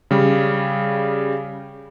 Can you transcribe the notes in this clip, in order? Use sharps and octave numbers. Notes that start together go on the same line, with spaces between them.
C#3 G3